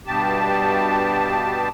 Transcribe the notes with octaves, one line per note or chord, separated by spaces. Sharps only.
G2 B2 G4 A5